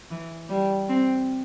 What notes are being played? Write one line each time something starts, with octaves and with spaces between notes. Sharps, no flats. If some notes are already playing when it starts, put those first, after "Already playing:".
E3
G3
C4